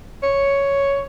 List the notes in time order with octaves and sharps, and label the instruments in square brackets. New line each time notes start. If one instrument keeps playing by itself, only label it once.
[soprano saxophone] C#5